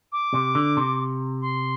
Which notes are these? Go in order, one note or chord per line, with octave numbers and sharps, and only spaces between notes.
D6
C3
D3
C3
C6